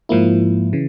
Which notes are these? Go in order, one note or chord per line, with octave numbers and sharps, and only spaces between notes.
G#2 F3 A#3 E4
C#3 E3